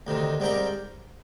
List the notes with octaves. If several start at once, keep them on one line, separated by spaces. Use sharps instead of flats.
D2 C3 D#3
G#2 G3 C4 G4 A#4